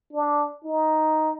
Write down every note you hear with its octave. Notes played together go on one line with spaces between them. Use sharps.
D4
D#4